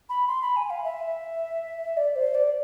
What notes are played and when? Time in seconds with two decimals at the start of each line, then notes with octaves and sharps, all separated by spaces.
0.09 B5
0.27 C6
0.42 B5
0.56 G#5
0.70 F5
0.84 E5
1.97 D5
2.16 C5
2.34 D5